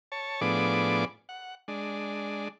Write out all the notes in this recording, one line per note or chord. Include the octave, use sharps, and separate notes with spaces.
C#5 A5
A2 F3 B3 D4 G#4 D6
F#5
G#3 D4